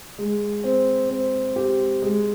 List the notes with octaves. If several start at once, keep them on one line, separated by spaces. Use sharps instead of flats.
G#3
C4
C4
G4
G#3